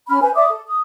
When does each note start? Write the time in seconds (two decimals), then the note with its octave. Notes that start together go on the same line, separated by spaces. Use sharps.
0.09 C#4 B5 F6
0.22 B4 C5 G#5
0.35 D5 E5 D6 D#6
0.50 A4
0.66 D#6